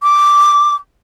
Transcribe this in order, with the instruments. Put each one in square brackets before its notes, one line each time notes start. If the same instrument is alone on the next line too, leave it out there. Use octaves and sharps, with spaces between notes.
[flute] D6